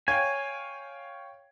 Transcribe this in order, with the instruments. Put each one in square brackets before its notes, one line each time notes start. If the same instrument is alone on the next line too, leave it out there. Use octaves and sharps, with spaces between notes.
[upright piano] C#5 F5 G5 [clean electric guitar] G#5